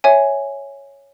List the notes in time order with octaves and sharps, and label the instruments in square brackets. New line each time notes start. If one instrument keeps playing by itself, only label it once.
[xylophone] C#5 E5 G#5